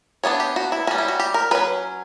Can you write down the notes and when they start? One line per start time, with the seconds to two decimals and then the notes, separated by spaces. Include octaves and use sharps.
0.24 E3 B3 D4 C#5
0.40 G4
0.56 F#4
0.72 E4
0.87 G3 C#4 F#4
0.98 E4
1.08 F#4
1.20 G4
1.34 A#4
1.51 F#3 C#4 B4